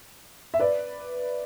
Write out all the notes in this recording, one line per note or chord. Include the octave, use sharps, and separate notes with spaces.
E5
B4 D5